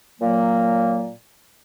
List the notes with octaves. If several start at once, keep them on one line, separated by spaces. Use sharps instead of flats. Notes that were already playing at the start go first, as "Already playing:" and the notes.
A#2 F#3 A#3